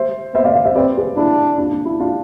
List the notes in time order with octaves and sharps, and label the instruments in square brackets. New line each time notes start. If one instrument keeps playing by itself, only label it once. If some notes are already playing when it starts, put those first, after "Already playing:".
Already playing: [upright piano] C5 E5
[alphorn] B3 [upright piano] C5 E5
[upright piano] D5 F5
D5 F5
C5 E5
[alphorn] C4 [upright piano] B4 D5
[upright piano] G#4 B4
[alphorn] D4 [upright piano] E4 G#4
[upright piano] D4 F4
D4
E4
D4 F4